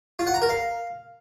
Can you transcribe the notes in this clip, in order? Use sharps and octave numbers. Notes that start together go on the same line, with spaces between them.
F4
F#5
A#5
A#4
F5